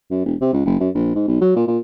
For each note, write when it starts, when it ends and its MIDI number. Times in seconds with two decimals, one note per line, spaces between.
0.11 0.21 42
0.26 0.35 28
0.41 0.52 48
0.53 0.61 37
0.66 0.79 30
0.80 0.89 42
0.95 1.11 34
1.15 1.24 44
1.28 1.39 35
1.41 1.54 54
1.56 1.66 46
1.67 1.79 46